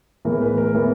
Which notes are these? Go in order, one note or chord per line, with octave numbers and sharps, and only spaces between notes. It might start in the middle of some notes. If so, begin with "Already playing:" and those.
A2 E3 G#3 B3 A#4
B4
A#4
A2 E3 G#3 B3